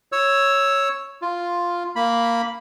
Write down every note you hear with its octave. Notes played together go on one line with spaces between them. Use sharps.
C#5 E6
F4
A#3 B5